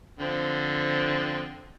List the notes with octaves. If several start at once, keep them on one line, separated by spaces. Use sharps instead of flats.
D3 F3 C4